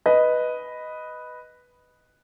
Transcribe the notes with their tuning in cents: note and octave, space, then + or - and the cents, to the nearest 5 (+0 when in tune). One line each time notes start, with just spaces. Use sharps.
B4 +0 D#5 +0